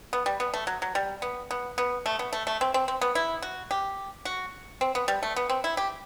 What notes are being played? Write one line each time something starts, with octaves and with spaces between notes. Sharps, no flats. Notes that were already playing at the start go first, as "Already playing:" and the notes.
B3
G3
B3
A3
F#3
F#3
G3
B3
B3
B3
A3
B3
A3
A3
C4
C4
C4
B3
E4
F#4
G4
F#4
C4
B3
G3
A3
B3
C4
E4
G4